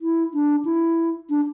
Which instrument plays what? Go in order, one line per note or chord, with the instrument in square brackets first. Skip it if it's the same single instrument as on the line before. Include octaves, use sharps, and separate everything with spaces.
[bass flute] E4
D4
E4
D4